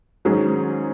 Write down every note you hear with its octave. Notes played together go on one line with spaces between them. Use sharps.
G#2 D#3 F#3 C#4 G#4